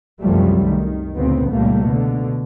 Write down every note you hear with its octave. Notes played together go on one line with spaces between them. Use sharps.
C2 F#2 F3 G3 A3
D#3
D2 A#2 C#3 B3 C4
C#2 A#2 G3 A3 A#3
B2 D3